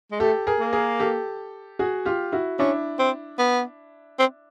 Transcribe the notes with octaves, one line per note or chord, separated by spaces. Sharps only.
G#3
A3 G4 A4
G#4 A#4
A#3
G#4 A#4
G4 A4
F#4 G#4
F4 G4
E4 F#4
C#4 D4 E4
C4
B3
C4